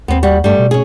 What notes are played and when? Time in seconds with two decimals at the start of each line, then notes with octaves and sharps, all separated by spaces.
0.08 D#2 B3 C4
0.23 G3 F#4
0.44 G2 G3 A3
0.59 B2
0.71 C#4 G#4